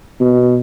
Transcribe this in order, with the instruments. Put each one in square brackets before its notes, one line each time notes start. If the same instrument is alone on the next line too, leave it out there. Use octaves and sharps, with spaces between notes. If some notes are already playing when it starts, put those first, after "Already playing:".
[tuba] B2